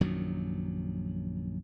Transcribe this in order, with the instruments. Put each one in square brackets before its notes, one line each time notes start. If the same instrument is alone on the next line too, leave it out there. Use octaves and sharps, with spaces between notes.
[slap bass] A#1 F#2 D#3 F#3